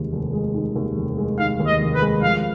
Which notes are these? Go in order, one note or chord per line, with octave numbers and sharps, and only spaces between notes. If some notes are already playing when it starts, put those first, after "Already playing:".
Already playing: F1 D#2 D#3 G#3
F1
G#3
D#3
D#2
F1
G#3
D#3 F5
D#2
D#5
F1
B4
G#3
F3 F5